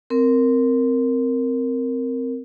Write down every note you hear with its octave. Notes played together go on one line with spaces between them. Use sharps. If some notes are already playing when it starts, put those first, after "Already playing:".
C4 A#4